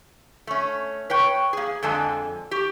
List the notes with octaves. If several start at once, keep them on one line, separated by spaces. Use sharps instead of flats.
A3 C#4
B4 C#5 G5
A#3 G#4
F2 D3 G#3 A4 G#5 A5
G4